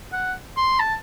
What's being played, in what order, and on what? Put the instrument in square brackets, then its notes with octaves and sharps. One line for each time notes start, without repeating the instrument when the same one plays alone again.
[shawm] F#5
C6
A5